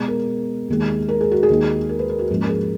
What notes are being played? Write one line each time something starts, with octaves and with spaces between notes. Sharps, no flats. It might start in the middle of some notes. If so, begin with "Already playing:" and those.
Already playing: B2 G#3 B3
A#4
D#2 D#3 G#3
A#4
G#4
F#4
G#4
D#2 D#3 G#3
A#4
B4
A#4
F#4
G#2 F3 A#3 C#4
A#4
G#4